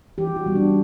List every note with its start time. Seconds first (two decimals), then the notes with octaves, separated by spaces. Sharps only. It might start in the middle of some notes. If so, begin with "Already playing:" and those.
0.18 E3 G4
0.36 F#4
0.46 G3 B3
0.55 D4